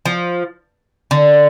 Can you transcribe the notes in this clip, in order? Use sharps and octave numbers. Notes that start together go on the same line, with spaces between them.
F3
D3